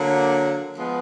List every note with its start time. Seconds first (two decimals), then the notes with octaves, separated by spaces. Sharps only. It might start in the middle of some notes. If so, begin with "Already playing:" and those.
Already playing: D3 F#3 A#3
0.77 F3 G#3 B3